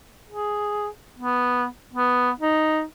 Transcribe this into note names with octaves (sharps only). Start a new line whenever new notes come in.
G#4
B3
B3
D#4